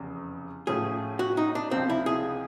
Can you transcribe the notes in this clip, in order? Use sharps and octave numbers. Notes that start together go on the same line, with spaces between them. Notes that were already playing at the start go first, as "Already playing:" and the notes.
Already playing: F1 E2 C#3
A2 F3 A3 C#4 G#4
F#4
D#4
D4
C#2 C3 F3 C4
E4
G#4